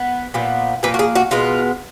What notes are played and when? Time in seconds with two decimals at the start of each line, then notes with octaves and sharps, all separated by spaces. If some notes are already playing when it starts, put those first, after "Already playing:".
Already playing: B3
0.34 A#2 F3 B3
0.83 A#2 F3 A#3 B4
0.94 F#4
0.99 G#4
1.15 F#4
1.31 B2 G#3 B3 F4